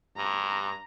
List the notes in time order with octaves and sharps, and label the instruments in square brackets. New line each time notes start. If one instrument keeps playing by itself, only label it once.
[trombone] G2 [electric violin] A#5